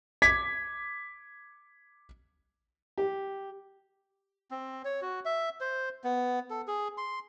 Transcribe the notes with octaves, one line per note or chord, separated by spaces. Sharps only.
D6 G#6 B6
G4
C4
C#5
F#4
E5
C5
B3
A4
G#4
C6